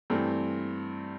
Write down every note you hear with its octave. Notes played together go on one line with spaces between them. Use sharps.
G2 E3 A3 C4